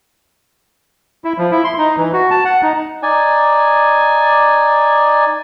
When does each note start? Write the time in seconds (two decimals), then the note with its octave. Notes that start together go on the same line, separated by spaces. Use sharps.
1.24 E4
1.38 F3
1.51 E4
1.64 C6
1.78 D#4
1.97 E3
2.13 F#4
2.31 A5
2.45 F#5
2.62 D#4
3.03 D#4 D5 G#5